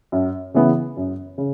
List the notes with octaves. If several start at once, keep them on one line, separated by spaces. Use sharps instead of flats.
F#2
C#3 E3 B3
F#2
C#3